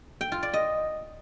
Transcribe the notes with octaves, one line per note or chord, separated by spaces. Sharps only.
G5
F4
D5
D#5